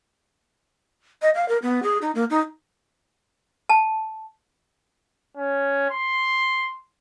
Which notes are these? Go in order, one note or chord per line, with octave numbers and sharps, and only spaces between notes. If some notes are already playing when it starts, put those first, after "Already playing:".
D#5
F5
A#4
B3
G#4
D#4
A#3
D#4
A5
C#4
C6